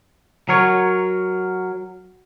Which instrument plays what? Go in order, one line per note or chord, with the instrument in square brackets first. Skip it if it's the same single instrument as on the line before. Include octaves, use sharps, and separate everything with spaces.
[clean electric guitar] F#3 A#4 C#5